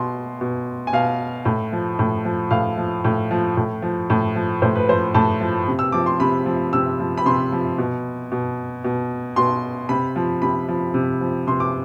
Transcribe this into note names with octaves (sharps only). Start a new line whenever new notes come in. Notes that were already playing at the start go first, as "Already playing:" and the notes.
Already playing: B2 C6
B2
G#5
B2 F5
A2
F3
A2
F3
A2 F5
F3
A2
F3
A2
F3
A2
F3
A2 C5
B4
F3 C5
A2 A5
F3
C3
E6
F3 D6
C6
C3 B5
F3
C3 E6
F3
B5
C3 C6
F3
B2
B2
B2
B2 C6
C3 B5
F3
C3 B5
F3
C3
F3
C3 C6
D6